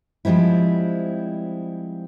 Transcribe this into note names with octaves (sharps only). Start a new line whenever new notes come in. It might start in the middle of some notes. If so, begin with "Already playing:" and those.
F3 G3 G#3 C4 E4